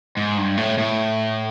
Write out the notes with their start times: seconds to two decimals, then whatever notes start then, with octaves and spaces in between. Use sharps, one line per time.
0.17 G#2
0.37 G2
0.57 A2
0.78 A2